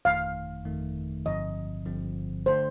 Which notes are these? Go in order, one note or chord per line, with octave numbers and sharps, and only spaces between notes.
G1 F2 D#3 A3 D#4 F5
G1 F2 D#3 A3 D#4
G1 G2 D3 F3 C4 D#5
G1 G2 D3 F3 C4
D3 A3 D4 A4 C5